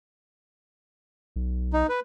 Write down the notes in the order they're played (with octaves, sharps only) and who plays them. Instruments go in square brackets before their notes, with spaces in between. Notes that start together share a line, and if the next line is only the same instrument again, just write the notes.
[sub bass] B1
[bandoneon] D#4
B4